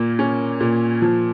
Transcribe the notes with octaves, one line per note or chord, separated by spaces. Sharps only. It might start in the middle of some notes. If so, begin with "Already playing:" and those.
Already playing: A#2 A#3
C#4
A#2
F3